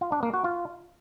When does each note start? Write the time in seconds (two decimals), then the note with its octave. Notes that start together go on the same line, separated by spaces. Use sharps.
0.01 F4
0.12 D4
0.23 A#3
0.34 F#4
0.44 F4